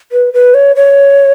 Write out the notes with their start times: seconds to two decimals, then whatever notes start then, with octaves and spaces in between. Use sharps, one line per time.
0.12 B4
0.33 B4
0.54 C#5
0.76 C#5